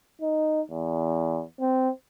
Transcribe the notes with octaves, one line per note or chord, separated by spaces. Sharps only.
D#4
E2
C4